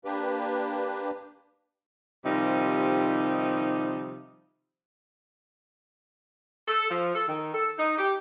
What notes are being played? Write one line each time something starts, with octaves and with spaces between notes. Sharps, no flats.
A#3 D4 G4 B4
C3 D#3 F3 G3 D#4
A4
F3
A4
D#3
A4
D#4
G4